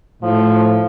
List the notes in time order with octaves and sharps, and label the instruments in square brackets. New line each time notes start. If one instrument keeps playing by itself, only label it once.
[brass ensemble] A2 [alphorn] F3